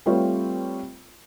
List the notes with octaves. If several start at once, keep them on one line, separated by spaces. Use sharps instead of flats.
G3 A3 C4 F4 B4 C#5